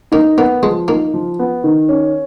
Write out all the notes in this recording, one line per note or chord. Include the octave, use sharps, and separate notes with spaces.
A#3 D#4
A#3 B3
F3 G#3
A#3 D#4
F3
B3
D#3
C#4